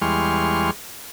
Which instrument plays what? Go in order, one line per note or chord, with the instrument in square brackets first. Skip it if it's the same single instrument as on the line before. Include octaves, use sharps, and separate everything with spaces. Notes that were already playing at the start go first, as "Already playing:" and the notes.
[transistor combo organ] E2 G3 G#3 C6 C#6 F6